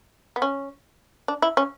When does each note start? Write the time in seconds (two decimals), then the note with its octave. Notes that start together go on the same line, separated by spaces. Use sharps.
0.36 B3
0.42 C#4
1.28 D4
1.42 E4
1.57 C#4